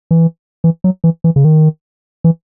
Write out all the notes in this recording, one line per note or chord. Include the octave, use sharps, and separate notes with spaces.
E3
E3
F#3
E3
E3
C#3
D#3
E3